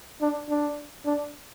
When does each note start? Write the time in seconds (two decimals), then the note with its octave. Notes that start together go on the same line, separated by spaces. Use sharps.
0.21 D4
0.49 D4
1.06 D4